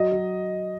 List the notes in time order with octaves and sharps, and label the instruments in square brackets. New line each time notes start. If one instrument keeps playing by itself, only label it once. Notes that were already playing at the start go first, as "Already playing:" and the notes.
Already playing: [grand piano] F#3 D#5
F#3